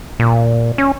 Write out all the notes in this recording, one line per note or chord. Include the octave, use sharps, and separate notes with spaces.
A#2
C#4